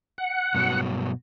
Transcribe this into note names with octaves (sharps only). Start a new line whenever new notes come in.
F#5
G2 B2 F#3